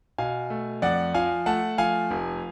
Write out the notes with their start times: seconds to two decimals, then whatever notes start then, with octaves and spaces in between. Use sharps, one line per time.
0.18 B2 F5 G#5
0.50 A3
0.82 F2 D5 F#5
1.14 F3 F5 G#5
1.46 A3 F#5 A5
1.78 F3 F5 G#5
2.11 F1